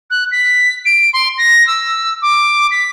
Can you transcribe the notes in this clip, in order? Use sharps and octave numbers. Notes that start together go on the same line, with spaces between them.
F#6
B6
D7
C6
A#6
E6
D6
B6